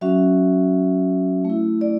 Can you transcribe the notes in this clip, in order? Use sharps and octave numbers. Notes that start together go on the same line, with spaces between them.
F#3 C#4 F#4 E5
A3 E4
D5